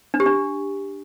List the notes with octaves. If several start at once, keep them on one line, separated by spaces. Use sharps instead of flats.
D4
G4
D4